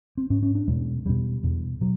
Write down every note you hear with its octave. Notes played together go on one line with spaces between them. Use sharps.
C4
G#2 C#4
C#4
D4
E2 B2 G#3
E2 B2 G3
E2 B2
B2 F#3